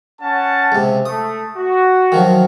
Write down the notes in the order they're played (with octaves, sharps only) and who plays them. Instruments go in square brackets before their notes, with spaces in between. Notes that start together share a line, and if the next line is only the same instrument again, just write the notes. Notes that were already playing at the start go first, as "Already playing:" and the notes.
[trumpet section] C#4 F#5 A5
[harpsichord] C#2 C3
[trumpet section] A3 [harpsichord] D#6
[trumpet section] F#4
[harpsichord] D#3 F3 F#3